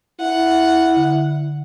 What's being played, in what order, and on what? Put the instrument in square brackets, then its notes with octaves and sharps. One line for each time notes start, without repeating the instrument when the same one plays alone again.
[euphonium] E4 [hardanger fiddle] F#5
[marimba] D3